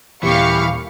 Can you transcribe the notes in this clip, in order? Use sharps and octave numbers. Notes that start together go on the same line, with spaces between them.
D#1 D#2 E3 G4 F5 C#6